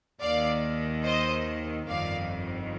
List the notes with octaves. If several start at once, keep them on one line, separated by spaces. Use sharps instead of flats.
D#2 D#3 D5 F5
C5 D#5
G1 F2 D#3 D5 F5